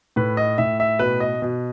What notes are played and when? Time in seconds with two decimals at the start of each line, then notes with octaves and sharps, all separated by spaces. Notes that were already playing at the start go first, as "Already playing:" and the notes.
0.16 A2 B4
0.37 D#5
0.58 A2 E5
0.80 E5
0.99 B2 B4
1.20 D#5
1.42 B2